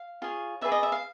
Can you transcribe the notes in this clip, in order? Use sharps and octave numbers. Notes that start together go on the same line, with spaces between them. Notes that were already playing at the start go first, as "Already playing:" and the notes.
Already playing: F5
F4 G#4 C#5
G#4 B4 D5 E5
D#5
E5
F5